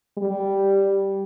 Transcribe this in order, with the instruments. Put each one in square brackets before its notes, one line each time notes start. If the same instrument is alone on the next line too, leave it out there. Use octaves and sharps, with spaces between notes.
[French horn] G3